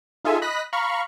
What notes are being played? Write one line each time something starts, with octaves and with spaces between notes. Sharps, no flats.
D#4 F4 G#4 A4 E5 G#5
D#5 B5 D#6 F#6 A#6 B6
F5 A#5 B5 C#6 F6